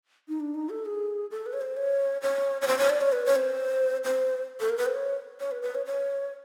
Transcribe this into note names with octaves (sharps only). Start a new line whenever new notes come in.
D#4
D4
D#4
A4
G#4
A4
B4
C#5
C5
C#5
C#5
C#5
C5
C#5
D5
C#5
B4
C#5
C5
C5
A4
A#4
B4
C5
C#5
C#5
B4
B4
C#5
C#5